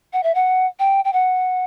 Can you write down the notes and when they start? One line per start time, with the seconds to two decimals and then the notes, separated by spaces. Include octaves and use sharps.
0.13 F#5
0.23 E5
0.35 F#5
0.79 G5
1.05 G5
1.13 F#5